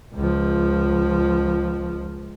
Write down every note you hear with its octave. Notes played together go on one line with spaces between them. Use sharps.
C#2 F3